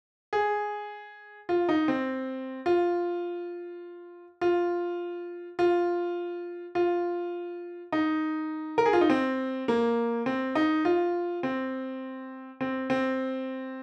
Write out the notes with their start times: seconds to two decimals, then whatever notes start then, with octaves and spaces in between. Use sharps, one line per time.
0.33 G#4
1.49 F4
1.69 D#4
1.88 C4
2.66 F4
4.41 F4
5.59 F4
6.75 F4
7.92 D#4
8.78 A#4
8.86 G#4
8.93 F4
9.01 D#4
9.10 C4
9.68 A#3
10.26 C4
10.55 D#4
10.85 F4
11.43 C4
12.61 C4
12.90 C4